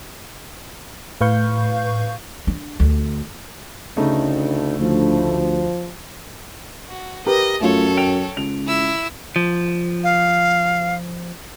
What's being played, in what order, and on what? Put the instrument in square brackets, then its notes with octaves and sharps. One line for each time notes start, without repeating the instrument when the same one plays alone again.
[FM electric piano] A2 B4 F5 C#6 G6
[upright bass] D4
D2
[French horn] D2 [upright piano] C#3 A3 D#4
[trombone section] D2 [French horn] F3
[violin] F#4
[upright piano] G4 A#4 B4 [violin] D#5
[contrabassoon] F#2 [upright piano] A3 F4 [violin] A4 C#5
[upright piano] G5 D7 F7
[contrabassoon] C#2 [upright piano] F7
[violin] E4 E6
[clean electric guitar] F3
[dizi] F5